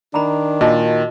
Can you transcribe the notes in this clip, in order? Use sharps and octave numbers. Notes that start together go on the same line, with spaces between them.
D#3 D4 A#5 B5
A#2 F#4 D#5 A5